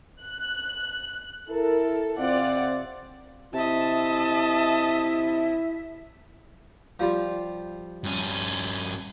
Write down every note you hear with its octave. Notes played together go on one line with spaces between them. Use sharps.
F#6
E4 A4 A#4
C3 C4 F4 D5 F#5
C3 E4 D#5 E5 A5
F3 G3 F4
G2 C#4